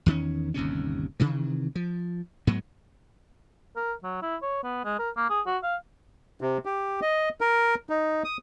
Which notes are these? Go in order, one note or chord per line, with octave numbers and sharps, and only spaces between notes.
E2 D#3 C4 C#4
G1 D#2 C3 C#4
C3 D#3 E3
F3
G#2 F#3 B3
A#4
F#3
E4
C#5
B3
G#3
A#4
A#3
G#4
F#4
F5
C3
G4
D#5
A#4
D#4
D#6